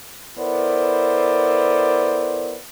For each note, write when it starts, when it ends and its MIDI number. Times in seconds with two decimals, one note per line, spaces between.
0.38 2.57 59
0.38 2.57 64
0.38 2.57 69
0.38 2.57 70
0.38 2.57 72
0.38 2.57 74